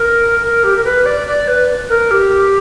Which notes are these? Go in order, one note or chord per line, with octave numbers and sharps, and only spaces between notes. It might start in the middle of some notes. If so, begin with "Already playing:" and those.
Already playing: A#4
A#4
G4
A#4
B4
D5
D5
B4
A#4
G4